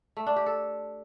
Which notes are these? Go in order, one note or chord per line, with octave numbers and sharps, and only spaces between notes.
A3
D4
G4
A4